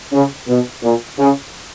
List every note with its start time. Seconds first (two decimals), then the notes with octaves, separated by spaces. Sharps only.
0.12 C#3
0.48 B2
0.82 A#2
1.18 C#3